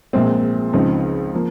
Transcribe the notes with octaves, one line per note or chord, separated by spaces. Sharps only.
A#1 A#2 G#3 C4
C#2 C#3 F3 C4 D#4
F3 A#3